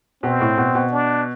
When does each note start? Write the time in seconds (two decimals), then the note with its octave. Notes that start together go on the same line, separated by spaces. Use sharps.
0.23 B2 C4
0.41 A2
0.57 B2
0.75 B2
0.92 D4